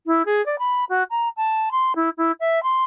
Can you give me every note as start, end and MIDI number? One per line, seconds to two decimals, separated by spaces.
0.06 0.22 64
0.25 0.44 68
0.45 0.58 74
0.58 0.84 83
0.89 1.03 66
1.10 1.28 82
1.36 1.69 81
1.71 1.92 84
1.95 2.09 64
2.17 2.31 64
2.40 2.62 76
2.63 2.84 84